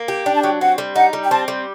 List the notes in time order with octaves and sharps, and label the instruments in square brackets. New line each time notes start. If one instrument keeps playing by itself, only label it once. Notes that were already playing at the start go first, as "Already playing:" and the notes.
Already playing: [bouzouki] A#3
G4
[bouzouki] D4 [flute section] G5
[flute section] A5
[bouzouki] F#3 [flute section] G5
[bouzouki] C4 [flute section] F#5
[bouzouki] G3
[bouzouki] D#4 [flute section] F#5
[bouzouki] G3
[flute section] G5
[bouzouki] C4 [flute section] A5
[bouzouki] G3